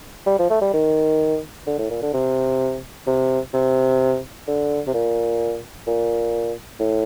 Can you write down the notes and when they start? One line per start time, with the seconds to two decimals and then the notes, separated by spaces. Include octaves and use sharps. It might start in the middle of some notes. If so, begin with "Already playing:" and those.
0.26 G3
0.39 F3
0.50 A3
0.62 G3
0.74 D#3
1.67 D3
1.78 A2
1.90 A#2
2.02 D3
2.13 C3
3.07 C3
3.53 C3
4.47 D3
4.87 C3
4.94 A#2
5.87 A#2
6.80 A2